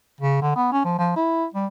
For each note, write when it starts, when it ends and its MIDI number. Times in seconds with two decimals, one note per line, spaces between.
0.21 0.41 49
0.42 0.51 50
0.56 0.69 59
0.72 0.81 61
0.85 0.97 53
0.99 1.12 53
1.16 1.46 64
1.54 1.66 55